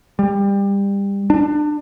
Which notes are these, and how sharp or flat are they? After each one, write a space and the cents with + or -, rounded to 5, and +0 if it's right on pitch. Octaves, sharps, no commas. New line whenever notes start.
G3 +25
D4 +30